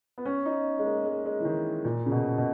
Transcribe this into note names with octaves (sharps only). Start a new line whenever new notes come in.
B3
C#4
D#4
G#3
A#3
G#3
G#3
E3
D#3
A#2
C#3
B2
B2